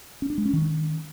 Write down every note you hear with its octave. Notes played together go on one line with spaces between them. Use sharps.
C#4
D4
G#3
C#4
D#3